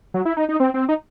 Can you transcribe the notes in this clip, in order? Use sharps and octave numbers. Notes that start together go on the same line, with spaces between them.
F#3
E4
D#4
D#4
C4
C4
D#4